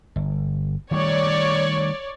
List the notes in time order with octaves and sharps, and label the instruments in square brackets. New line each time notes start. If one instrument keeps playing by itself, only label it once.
[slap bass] G1
[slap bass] D#3 G3 A3 [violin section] C#5 D5